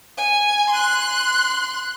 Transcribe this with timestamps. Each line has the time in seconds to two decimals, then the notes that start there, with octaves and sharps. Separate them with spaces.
0.17 G#5
0.70 C6 F#6